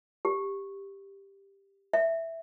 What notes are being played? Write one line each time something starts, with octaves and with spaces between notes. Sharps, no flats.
G4
E5